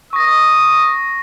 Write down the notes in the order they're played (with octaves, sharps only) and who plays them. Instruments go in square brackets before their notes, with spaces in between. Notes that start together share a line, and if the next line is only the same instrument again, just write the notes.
[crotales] C#6 A#6 [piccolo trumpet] D#6